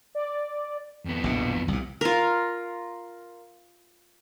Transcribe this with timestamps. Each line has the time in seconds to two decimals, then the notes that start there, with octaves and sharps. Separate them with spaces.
0.15 D5
1.05 F2 B3
1.24 A#1 B2
1.68 C2 A#2
2.01 F4 A#4